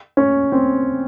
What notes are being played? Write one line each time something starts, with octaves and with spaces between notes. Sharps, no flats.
C#4
C4